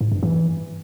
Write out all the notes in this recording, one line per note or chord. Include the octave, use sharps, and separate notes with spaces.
G#2
G2
E3